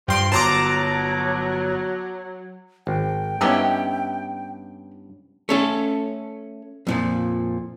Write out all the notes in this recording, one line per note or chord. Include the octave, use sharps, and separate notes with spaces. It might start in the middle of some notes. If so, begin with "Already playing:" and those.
G2 F3 G5 C6 D7
G1 F#3 A5 A#5 C6 D6
G#1 G5
G2 B3 C#4 D#4 E4 G4
A3 C#4 A4
F2 A#2 F3